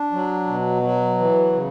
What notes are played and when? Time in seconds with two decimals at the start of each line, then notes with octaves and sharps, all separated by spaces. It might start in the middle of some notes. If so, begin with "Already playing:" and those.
Already playing: D4
0.12 F#3
0.47 B2
0.82 F#3
1.18 E3
1.52 C#3